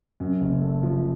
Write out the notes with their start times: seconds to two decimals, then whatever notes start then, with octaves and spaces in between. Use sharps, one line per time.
0.20 F#2
0.41 F#1
0.61 A3
0.83 F3